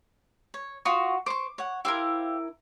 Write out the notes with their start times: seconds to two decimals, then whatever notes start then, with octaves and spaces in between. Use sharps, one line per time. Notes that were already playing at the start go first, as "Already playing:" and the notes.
0.54 C#5
0.85 F4 F#4 C#6 D#6
1.26 C5 C#6 D6
1.58 C#5 F#5
1.85 E4 G4 A#4 C5 F5